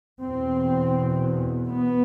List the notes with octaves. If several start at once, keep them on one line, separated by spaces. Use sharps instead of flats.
E2 B2 C4
B3